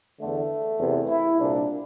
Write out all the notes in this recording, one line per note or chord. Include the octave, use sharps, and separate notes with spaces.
E2 D3 A3
E2 C3 E3
E4
C2 A#2 D4